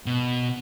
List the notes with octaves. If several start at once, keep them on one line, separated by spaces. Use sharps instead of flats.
B2